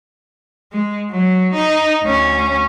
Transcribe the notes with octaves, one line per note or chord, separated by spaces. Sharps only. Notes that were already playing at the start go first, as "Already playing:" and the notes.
G#3
F#3
D#4
D2 C#4